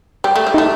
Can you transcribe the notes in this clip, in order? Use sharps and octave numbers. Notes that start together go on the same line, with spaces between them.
G3 G4
A3
G3
A3 D#4